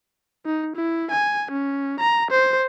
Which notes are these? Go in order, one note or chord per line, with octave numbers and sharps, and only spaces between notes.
D#4
E4
G#5
C#4
A#5
C5